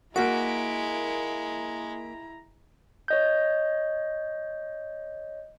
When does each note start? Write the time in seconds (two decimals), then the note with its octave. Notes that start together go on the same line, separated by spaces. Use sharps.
0.16 G#3 A#3 E4 F#4 A#5 B6 D7
3.08 C#5 D#5 G6